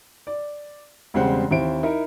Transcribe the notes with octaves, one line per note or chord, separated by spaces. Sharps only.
D5
E1 C#3 G3 G#3 C4 F#5
D#2 C4 E4 D7
D#4 E4 A#4